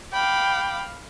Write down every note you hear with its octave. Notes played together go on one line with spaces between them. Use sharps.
F5 G5 B5 D6